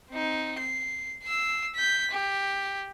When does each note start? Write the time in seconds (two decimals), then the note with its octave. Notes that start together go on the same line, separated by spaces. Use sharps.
0.11 C4 D#4
0.59 C7
1.23 E6 C7
1.75 G6 B6
2.11 G4